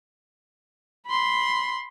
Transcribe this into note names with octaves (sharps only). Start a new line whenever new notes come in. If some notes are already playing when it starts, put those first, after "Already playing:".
B5 C6